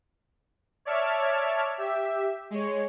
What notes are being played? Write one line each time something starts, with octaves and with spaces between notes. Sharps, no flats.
C#5 D5 E5 A5 F6 G#6
G4 E5
G#3 C#5